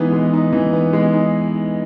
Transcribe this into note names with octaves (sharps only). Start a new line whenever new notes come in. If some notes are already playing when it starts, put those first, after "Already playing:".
Already playing: E3 G#3 B3 D#4
G#3
D#4
E3
B3
G#3
D#4